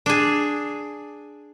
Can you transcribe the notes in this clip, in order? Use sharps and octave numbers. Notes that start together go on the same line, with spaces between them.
D4 G#4